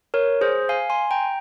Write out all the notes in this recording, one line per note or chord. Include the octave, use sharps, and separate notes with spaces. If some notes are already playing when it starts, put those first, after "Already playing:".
A#4 C#5
G#4 C5
F5 G#5
G#5 C6
G5 A#5